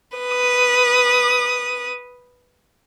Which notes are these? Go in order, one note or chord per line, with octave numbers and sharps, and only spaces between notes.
B4 D#6